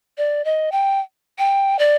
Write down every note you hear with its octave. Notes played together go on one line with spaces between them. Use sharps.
D5
D#5
G5
G5
D5